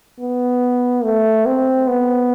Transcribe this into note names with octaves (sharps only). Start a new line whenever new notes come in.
B3
A3
C4
B3